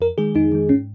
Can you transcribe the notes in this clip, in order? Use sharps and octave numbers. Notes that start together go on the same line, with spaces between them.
F2 A#4
D#3 G#3 G#4
F2 D#4
D#3 G#3
G#2 C#4